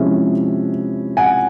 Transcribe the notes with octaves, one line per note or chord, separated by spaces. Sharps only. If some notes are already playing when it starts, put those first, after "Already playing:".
Already playing: C3 F3 G#3 C#4 E4 E5
F#5 G#5